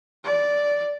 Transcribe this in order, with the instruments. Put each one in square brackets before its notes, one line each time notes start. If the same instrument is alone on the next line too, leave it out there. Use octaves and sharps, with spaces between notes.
[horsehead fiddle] D5